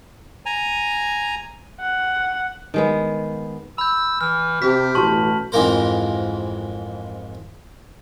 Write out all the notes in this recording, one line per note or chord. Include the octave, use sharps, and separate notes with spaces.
G#5 A#5
F#5
D#3 G#3 B3
B5 E6 G6
E3 F6
C3 G4 B6
A1 B2 F#4 A5 C#6 F#7
F2 G#2 E3 A#3 A#4 C5